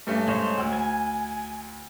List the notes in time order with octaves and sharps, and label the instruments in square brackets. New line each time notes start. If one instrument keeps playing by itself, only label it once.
[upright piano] G2 A3 C#4
[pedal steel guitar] G#3 C5 C#5
[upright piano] D2 E6
[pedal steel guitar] G#5